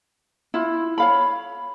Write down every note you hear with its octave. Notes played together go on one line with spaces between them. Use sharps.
E4 F4
C#5 F5 B5